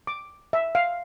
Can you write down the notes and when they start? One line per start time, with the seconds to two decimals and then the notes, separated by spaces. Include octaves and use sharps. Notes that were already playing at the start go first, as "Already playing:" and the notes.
0.07 D6
0.53 E5
0.75 F5